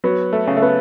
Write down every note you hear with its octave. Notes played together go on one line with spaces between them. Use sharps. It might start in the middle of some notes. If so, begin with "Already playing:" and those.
F#3 B3
A3
C#3
A3
B3